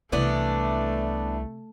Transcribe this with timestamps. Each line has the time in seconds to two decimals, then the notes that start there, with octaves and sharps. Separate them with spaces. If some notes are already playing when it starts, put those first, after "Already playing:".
0.12 C2 C3 E3 A3 B3 C4 D4